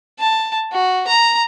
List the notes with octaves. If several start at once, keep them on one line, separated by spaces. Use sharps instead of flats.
A5
F#4
A#5